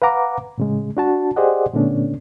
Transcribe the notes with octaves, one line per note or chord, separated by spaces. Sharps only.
B4 F5 F#5 A#5 D6
A2 C#3 G#3
D4 F#4 A5
G4 G#4 C5 D5 D#5 F#5
A#2 D3 A3 B3 C#4 D4